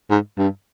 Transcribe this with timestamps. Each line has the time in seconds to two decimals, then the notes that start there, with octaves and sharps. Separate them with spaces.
0.10 G#2
0.38 G2